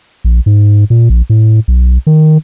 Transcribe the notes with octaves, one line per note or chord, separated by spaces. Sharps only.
A#1
G#2
A#2
A#1
A2
B1
D#3